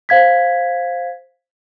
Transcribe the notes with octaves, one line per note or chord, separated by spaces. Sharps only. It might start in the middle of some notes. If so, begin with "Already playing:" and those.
C5 F5 G#6 B6